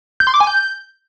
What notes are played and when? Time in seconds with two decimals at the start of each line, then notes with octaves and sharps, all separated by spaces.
0.20 G6
0.27 C6
0.34 D6
0.40 G#5
0.47 G6